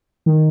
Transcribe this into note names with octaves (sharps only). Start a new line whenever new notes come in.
D#3